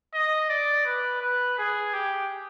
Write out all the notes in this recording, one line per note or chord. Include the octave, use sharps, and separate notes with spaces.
D#5
D5
B4
B4
G#4
G4